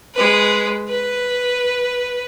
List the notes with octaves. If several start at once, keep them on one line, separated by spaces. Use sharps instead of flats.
G#3 B4
B4